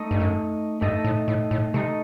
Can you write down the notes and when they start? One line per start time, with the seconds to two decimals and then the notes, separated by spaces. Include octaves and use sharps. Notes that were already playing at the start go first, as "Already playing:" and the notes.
Already playing: A3 D#4 A4 D#5
0.11 G2
0.20 F#2
0.81 G2 A3 D#4 A4 D#5
1.05 A2
1.28 A2
1.51 A2
1.74 C3 A3 D#4 A4 D#5